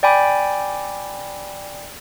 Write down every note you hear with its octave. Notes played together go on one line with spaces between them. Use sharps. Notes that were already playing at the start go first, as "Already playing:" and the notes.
D5 G5 G#5 B5 D6